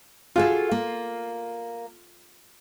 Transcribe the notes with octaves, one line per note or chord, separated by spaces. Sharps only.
F4 F#4 G#4 A4
A#3